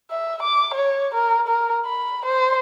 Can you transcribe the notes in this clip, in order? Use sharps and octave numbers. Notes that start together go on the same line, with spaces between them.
E5
D6
C#5
A#4
A#4
B5
C5